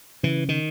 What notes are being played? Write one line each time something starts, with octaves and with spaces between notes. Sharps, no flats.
C#3 E3
D#3